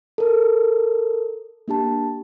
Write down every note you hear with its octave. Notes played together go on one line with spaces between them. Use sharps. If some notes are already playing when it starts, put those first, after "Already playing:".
A4 A#4
A#3 D4 G4 A5